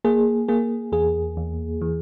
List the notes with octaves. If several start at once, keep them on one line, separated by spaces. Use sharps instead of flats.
A#3 G#4
A#3 G#4
E2 G#4
E2
E3